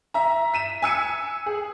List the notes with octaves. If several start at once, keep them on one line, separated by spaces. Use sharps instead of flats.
E5 A#5
B6 D#7 E7
G#5 E6 C#7 D#7
G#4